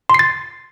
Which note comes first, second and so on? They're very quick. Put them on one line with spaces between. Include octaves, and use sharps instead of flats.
C6 C7 A6